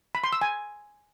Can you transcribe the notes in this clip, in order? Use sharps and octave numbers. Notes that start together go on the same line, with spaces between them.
B5
C6
E6
G#5